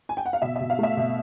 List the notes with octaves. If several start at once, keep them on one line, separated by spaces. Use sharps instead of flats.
G#5
G5
F#5
F5
B2 E5
E5
B2
F5
A3 E5
B2